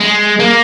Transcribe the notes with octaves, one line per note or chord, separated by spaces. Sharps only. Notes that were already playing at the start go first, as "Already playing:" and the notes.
G#3
A#3